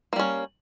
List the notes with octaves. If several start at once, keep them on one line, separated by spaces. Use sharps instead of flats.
G3 A#3 C#4